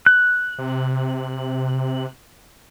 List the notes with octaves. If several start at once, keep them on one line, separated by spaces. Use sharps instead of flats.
F#6
C3